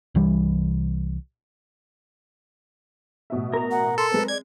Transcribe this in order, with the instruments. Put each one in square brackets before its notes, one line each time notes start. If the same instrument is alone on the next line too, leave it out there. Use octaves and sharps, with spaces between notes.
[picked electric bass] C2 E3 G3
[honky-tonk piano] A1 B2 E5
[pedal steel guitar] A#4 A#5
[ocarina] F#5
[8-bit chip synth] A4 [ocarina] C6
[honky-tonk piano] G#3 C4 [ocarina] B4
[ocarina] D5 [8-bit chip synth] G#6